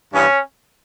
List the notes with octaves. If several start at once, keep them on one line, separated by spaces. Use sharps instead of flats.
G2 E3 B3 C#4